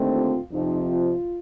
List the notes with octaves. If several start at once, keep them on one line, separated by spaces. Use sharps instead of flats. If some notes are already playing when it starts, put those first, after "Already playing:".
Already playing: D#2 D3 A3 C4 D#4
F4
F2 C3 F3 C4 D#4
F4